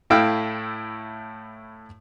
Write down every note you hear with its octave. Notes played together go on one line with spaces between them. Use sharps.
A2 A3 E4 F5 G5